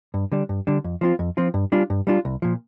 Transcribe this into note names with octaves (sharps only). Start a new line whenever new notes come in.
G2
D3 G3 D4
G2
D3 G3 D4
F2
F3 C4 F4
F2
F3 C4 F4
G2
G3 D4 F4
G2
G3 D4 F4
C2
A#2 F3